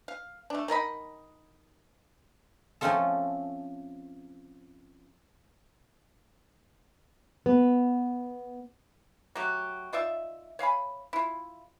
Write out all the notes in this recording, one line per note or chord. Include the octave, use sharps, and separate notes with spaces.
F5
A3 D4
D#3 A#4 D#5 B5
F3 A3 C4 C#4 F4 A4
B3
F#3 A3 F#4 G4
D#4 F4 D5 E5
C#5 F5 G#5 B5
E4 F4